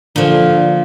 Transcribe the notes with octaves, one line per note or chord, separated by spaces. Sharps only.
A#2 D3 F3